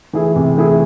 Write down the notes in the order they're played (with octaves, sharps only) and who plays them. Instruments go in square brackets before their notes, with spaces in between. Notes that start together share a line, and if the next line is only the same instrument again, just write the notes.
[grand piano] E3 A3 E4 G#4
C3
E3 A3 E4 G#4